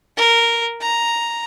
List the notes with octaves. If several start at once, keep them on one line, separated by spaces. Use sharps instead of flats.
A#4
A#5